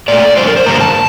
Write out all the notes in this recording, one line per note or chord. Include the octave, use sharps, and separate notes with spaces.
A#2 A3 D5
F2 D3 G3 C5
A#4
C5
G2 D3 G3 A#3 A#5
A5